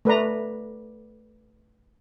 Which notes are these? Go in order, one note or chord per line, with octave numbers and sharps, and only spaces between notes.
A3 B4 D5 A#5